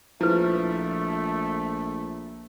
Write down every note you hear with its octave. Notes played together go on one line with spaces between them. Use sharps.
A#1 F3 A3 E4 B4